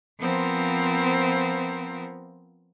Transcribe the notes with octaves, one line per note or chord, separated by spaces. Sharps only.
F3 B3 C4 F4 A#4